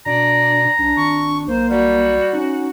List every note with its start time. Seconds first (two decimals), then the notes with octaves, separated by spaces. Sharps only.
0.06 B2 D4 D5 A#5
0.78 B1 D4
0.97 G#1 C#6
1.48 B1 A#3 C5
1.70 G3 F#4
2.33 C#4 D#4